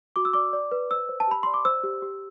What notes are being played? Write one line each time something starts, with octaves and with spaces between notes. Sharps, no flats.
F#4 D6
E6
D5 D6
D5
B4
C5 E6
C5
A5
G4 B5
D5 C6
D6
C5 E6
G4
G4